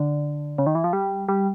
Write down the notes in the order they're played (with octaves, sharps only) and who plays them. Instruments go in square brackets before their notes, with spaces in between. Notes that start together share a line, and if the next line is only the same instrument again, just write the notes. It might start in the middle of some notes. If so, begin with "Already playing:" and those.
Already playing: [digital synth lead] D3
C#3
D#3
E3
F3
G3
G3